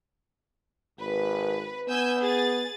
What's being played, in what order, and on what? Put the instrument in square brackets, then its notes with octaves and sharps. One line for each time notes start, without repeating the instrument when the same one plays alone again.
[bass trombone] G#1 [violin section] B4
[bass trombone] B3 [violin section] G#5 E6 G6
[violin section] G#4 A6